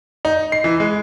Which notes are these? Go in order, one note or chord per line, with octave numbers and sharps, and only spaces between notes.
D#4
C7
E3
G#3